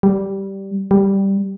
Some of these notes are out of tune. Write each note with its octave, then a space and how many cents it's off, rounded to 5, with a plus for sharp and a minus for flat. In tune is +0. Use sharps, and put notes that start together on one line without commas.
G3 -10
G3 +0